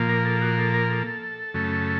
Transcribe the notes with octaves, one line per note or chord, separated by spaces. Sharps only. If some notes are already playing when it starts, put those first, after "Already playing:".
Already playing: A#2 F3 A#3
A#4
A4
F#4
A4
A#4
A4
F#2 C#3 A3